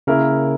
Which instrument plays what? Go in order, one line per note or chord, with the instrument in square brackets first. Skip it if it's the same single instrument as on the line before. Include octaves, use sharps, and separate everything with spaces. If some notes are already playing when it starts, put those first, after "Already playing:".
[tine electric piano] C#3 [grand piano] A#3 E4 A#4